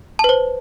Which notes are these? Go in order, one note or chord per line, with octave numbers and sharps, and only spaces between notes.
B4 C5 A5